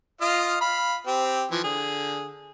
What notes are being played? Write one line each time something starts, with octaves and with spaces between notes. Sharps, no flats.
F4 D#5 F5
F5 B5
C4 G4
E3 F3
D3 G#4